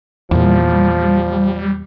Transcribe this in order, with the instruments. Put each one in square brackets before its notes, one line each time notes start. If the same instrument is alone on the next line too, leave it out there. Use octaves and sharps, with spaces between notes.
[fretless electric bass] E2 A#2 [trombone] F3 [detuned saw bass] G3